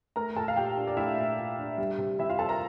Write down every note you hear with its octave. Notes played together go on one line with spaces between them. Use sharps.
A3 A#4 A#5
A#2 A4 A5
F5
A#2 G4 G5
D4
D5
A3 E4 E5
A#2
A#2
D4
G3
C3
C3 E4 E5
F4 F5
C4 A4 A5
A#4 A#5